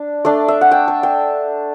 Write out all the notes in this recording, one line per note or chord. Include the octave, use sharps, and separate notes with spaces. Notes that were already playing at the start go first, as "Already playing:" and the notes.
Already playing: D4
A3 D4 D5
E5
F#5
G5
A5
G5